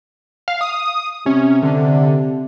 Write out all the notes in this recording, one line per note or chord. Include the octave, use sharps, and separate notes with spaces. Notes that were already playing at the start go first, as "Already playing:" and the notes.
F5
D#6
C3 C#4
D3